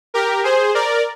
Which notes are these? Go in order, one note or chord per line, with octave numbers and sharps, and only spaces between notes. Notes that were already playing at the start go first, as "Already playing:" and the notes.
G4 A#4
G#4 C5
A#4 D5